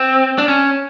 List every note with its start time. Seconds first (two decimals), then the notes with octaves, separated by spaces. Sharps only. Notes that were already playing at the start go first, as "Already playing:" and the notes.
Already playing: C4
0.38 D4
0.48 C#4